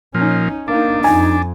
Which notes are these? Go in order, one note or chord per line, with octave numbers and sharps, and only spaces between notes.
A#2 F3 C#4 D#4
A#3 D4 D#4
F2 D#4 G#5